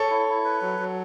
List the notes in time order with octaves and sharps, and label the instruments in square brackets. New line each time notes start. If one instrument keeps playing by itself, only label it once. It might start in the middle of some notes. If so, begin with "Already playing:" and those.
Already playing: [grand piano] A4 C#5
[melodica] E4
E4
B4
F#3
F#3